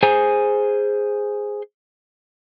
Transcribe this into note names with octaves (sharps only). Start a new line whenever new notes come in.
G#4 C5 G#5